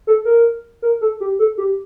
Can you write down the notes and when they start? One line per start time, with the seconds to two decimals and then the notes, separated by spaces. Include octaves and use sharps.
0.07 A4
0.25 A#4
0.82 A#4
1.01 A4
1.20 G4
1.39 A4
1.58 G4